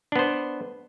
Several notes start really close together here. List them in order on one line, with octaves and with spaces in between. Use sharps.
D4 B3 C5